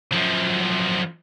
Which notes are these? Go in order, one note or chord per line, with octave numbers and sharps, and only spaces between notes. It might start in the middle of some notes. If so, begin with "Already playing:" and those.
F#2 F3